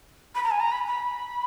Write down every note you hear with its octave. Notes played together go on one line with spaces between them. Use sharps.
B5
A#5
G#5
A#5
B5
B5